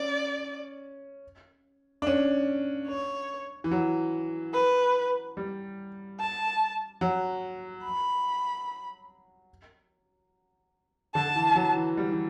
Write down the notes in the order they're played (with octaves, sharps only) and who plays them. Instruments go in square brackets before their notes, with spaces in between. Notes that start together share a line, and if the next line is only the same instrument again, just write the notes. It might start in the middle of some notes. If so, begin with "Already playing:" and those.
Already playing: [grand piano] C#4 [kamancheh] D5
[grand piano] D4
C#4
[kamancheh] C#5
[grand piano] E3
F#3
[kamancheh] B4
[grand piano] G3
[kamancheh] A5
[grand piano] F#3
[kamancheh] B5
[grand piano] D3 [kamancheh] A5
[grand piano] E3
F#3
E3
G3
E3